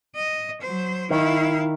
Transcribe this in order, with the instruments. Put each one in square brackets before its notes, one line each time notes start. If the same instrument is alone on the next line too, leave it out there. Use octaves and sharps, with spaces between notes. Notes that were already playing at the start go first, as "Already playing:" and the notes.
[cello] D#5
F#3 C5
[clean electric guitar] D#3 [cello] E4 F5